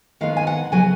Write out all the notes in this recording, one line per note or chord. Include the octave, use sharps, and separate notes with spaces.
D#3 G#3 B3 F5
G#5
F#5
C#3 F#3 B3 G#5